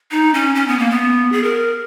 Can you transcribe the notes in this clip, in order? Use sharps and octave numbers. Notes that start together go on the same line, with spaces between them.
D#4
C#4
C#4
B3
A#3
B3
G#4
A#4